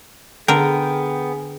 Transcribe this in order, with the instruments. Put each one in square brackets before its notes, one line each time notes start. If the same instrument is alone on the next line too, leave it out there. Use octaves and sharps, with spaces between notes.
[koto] D3 A#4 [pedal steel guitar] B3 G5 [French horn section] G#4